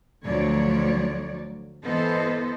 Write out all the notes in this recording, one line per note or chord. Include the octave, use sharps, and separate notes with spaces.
D2 F3 F#3 C#5 D5
E3 B3 A4 C5 D#5